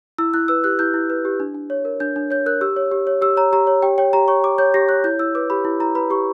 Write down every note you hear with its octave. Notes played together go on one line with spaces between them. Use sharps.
E4 E6
E4 F#6
B4 E6
G4 F#6
E4 G6
E4
B4
G4
D4
D4
C#5
A#4
D4 G6
D4
C#5 G6
A#4 F#6
G4 E6
C#5
G4
C#5
G4 E6
C#5 A#5
G4 A#5
C#5
G4 G5
C#5 G5
G4 A#5
C#5 C#6
G4 D6
C#5 G6
G4 A#6
C#5 F#6
E4 G6
E4 E6
B4 D6
G4 B5
E4
E4 A#5
B4 B5
G4 C#6